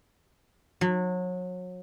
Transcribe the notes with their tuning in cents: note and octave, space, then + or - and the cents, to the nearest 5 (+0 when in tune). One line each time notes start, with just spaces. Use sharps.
F#3 -30